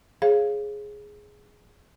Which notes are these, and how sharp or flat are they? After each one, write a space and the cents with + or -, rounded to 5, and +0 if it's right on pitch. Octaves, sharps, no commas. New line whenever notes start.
G#4 +0 C#5 -35 F5 +0